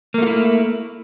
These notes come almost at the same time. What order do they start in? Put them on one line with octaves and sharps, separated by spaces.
A#3 A3 F4 E4